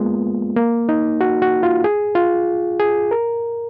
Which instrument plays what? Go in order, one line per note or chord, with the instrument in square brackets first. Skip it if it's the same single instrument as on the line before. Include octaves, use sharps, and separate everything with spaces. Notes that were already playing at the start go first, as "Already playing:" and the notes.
Already playing: [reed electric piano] G#3 A#3 B3 F4
A#3
D#4
F#4
F#4
F4
G#4
F4
G#4
A#4